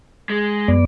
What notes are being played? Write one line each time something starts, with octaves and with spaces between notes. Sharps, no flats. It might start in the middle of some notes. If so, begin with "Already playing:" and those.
G#3
F#2 B3 D5